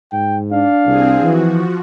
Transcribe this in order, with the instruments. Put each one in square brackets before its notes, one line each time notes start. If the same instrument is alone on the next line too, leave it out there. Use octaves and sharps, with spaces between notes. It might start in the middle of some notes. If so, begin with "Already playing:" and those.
[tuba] G#2 [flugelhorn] G5
[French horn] D4 [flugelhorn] F5
[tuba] C2 [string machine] C4 G#4
[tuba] E3 [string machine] F3 F#4